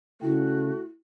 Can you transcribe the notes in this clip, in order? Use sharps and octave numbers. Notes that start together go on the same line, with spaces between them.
C#3 A3 E4 F#4 G5